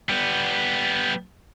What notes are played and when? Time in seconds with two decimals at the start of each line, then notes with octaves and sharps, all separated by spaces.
0.09 G3 B3